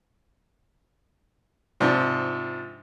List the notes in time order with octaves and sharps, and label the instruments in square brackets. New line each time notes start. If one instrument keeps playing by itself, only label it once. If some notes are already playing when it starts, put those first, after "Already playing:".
[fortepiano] G#2 C3 F3 D4